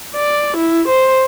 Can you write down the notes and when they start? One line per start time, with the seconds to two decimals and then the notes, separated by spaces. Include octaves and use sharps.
0.16 D5
0.57 E4
0.88 C5